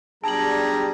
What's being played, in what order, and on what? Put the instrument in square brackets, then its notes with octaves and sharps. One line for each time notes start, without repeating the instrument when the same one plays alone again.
[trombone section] B1 D4 G4 [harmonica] G3 A#5 [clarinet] G#4 [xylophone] A5 F#7